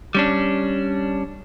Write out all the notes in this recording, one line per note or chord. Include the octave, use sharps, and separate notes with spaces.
G3 C#4 D4